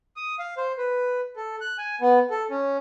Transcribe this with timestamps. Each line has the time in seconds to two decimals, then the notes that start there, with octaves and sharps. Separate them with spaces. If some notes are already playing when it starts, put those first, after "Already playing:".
0.16 D#6
0.39 F5
0.57 C5
0.78 B4
1.36 A4
1.61 F#6
1.78 G#5
2.01 B3
2.30 A4
2.50 C#4